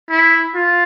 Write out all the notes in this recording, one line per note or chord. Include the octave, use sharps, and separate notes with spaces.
E4
F4